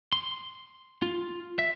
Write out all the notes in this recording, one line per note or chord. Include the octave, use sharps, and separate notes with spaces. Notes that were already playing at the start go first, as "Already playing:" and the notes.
C6
F4
E5